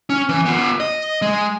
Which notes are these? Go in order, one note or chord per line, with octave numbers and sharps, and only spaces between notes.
C#4
E3
B3 F4
D#5
G#3